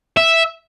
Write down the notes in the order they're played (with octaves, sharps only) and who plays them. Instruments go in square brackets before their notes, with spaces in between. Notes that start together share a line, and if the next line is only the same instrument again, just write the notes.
[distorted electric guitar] E5